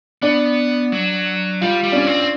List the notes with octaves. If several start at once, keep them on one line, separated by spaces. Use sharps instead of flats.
B3 D4
F#3
G3 F4
G3
D4
C#4
C4